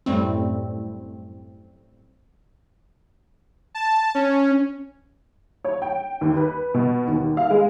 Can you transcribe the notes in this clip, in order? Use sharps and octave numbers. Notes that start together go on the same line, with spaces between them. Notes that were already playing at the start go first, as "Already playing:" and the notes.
F#2 A2 G3 A3 C4
A5
C#4
C#5
G5
D#2
B4
B2
D#2
F5
G#3